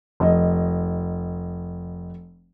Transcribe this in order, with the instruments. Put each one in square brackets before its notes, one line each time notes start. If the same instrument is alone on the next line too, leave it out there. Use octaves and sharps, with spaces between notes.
[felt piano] F1 D#5